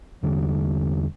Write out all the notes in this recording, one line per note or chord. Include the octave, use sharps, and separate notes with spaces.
E2 D3 G3